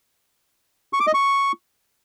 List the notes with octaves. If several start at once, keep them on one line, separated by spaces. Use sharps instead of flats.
C#6
D6
D#5
C#6